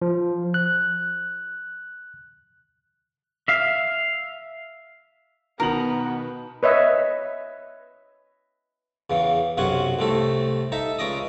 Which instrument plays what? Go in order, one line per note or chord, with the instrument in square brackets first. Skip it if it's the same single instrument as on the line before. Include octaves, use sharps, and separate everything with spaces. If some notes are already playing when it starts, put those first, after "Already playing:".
[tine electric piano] F3
F#6
[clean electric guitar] E5 F5
[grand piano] B2 D#3 F#7 [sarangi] B3 [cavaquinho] A#4
[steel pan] B4 C#5 D#5 E5
[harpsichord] E2 C#3 E3
B1 F#2 C3 C#4 F#5 G#5
C2 A2 C3 A3 A4
D#4 A4 E5
C#2 C#4 D5 D#5 D#6